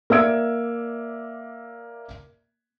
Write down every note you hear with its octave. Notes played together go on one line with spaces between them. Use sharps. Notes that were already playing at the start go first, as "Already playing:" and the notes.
A#3 D5 E5 E6 G#6 D7